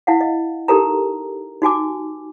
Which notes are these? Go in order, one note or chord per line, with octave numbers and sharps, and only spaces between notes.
E4 F5 F#5
D#5
D#4 G4 A4 A#4 A#5
D#4 F#4 G#5 D6